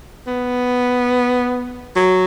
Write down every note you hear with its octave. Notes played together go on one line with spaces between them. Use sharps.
B3
F#3